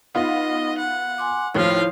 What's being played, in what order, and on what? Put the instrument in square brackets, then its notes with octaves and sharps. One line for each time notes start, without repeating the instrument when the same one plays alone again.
[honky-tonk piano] B3 F4 [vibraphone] D#4 [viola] D#5
[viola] F#5
[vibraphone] G#5 C6 D6
[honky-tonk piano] D#2 A2 [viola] F3 F5 [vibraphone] E4 C#5